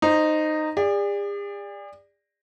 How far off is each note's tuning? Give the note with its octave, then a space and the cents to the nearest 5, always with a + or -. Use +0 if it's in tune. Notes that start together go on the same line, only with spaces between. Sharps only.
D#4 -10 C5 +0
G#4 -45 D5 +0